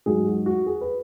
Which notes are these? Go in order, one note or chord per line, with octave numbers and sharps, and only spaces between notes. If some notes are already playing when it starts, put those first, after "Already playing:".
G#2 F#3 G#4
F#4
F#4
G#4
B4